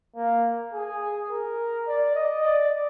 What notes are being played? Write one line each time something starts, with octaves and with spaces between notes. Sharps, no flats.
A#3
G#4
A#4
D5
D#5
D5